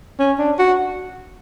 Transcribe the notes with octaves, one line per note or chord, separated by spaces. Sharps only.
C#4
D4
F#4